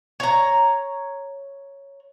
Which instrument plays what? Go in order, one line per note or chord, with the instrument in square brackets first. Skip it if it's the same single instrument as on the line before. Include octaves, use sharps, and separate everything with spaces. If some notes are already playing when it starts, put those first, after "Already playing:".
[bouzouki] C#5 A#5